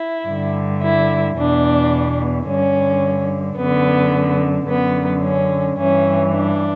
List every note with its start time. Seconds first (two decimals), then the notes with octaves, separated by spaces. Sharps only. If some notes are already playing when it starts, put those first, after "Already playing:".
Already playing: E4
0.27 G2 D3
0.82 E4
1.37 E2 B2 D4
2.47 G2 D3 C#4
3.57 F#2 D3 B3
4.68 F#2 D3 B3
5.23 C#4
5.78 G2 E3 C#4
6.33 D4